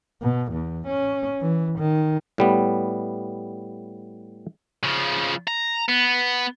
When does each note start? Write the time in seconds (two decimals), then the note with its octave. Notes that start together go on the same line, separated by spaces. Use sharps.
0.22 B2
0.52 E2
0.87 C#4
1.42 E3
1.79 D#3
2.38 A2 G3 B3
4.83 C#3 F3
5.47 A#5
5.89 B3